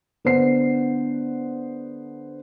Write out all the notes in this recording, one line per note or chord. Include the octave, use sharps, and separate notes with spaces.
D3 B3 D4 C5 F#5 C7